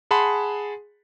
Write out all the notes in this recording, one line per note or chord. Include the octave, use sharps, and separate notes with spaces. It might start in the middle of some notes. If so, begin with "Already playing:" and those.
G#4 F#5 A5 B5 C6